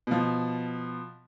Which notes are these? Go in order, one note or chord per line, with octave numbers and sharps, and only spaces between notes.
B2 F3